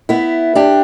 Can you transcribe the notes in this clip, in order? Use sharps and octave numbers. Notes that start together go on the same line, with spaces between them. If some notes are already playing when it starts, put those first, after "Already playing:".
B3 E4
D4 G4